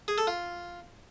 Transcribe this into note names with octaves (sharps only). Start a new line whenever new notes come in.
G#4
A4
F4